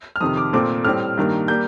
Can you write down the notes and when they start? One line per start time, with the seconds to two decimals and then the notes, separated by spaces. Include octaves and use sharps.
0.16 F6
0.21 F2 C3 D#3 D#6
0.37 D6
0.53 A#2 A3 C4 D6
0.85 A2 G3 C4 F6
1.18 G2 D#3 A#3
1.48 G3 A#3 G6